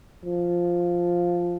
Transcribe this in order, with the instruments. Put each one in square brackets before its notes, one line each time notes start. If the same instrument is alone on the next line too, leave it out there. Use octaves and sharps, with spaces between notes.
[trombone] F3